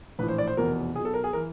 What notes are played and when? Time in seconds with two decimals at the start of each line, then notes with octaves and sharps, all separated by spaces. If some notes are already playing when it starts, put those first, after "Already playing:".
0.19 A#1 A2 E3 B4
0.28 C5
0.38 D5
0.47 C5
0.57 F1 E2 B2 A#4
0.95 B1 G#4
0.99 B2
1.05 A4
1.14 A#4
1.24 G#4
1.33 E3 A#4